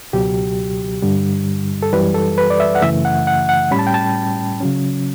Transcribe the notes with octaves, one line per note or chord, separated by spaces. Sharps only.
C#2 B2 F#3 G4
G2 D3 G3
A4
F#2 E3 G3 B4
A4
B4
D5
E5
F#5
F#2 C#3 E3 A3 E5
F#5
F#5
F#5
A2 G3 C#4 B5
A5
G5
A5
C#3 F#3 C#4